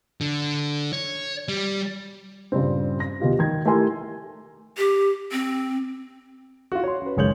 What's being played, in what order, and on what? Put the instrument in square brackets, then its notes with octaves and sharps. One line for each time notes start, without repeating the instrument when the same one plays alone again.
[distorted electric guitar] D3
C#5
G3
[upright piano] G2 A#2 C#3 C4
A#6
D#2 B2 F4 G4
D#3 G#6
A3 E4 G4 A#4 G#5 C6
[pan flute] G4
C4
[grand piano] F4 F#4
C#5 C6
C#4 B4
F#1 D#3 G#3 C#5 G6 F#7